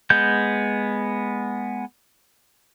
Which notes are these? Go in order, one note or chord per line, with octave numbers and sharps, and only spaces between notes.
G#3 B3 G6